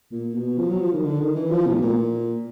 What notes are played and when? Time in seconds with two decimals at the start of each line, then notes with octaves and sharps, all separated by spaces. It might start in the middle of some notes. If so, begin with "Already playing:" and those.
0.11 A#2
0.35 B2
0.58 F3
0.70 F#3
0.81 F3
0.93 D#3
1.05 D3
1.20 D#3
1.36 E3
1.51 F3
1.66 B2
1.75 A2
1.82 A#2